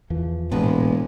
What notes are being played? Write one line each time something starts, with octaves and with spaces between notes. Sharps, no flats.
E2 E3 F3
E1 A1 A#2 G#3 B3 B4